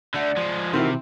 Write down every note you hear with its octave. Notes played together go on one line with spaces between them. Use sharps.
D3 A3 D5 F#5
F3 G#3
C3 D#3 E3 C4 F#4 F6